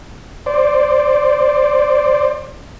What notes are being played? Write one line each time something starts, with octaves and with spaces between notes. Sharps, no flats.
C5 D5